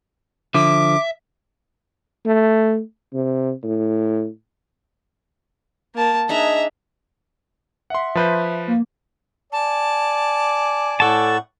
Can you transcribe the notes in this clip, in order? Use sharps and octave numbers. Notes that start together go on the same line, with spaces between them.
D3 F3 E5 D6
A3
C3
A2
A#3 A5
D4 D#4 G#4 E5 A#5
E5 F#5 C6
F3 B4 C5
A#3
D5 G#5 A5
A2 A4 F#5 A5 C#6